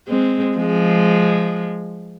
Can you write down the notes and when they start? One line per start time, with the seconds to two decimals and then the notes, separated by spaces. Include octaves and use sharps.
0.08 G#3 C4
0.57 F3 G#3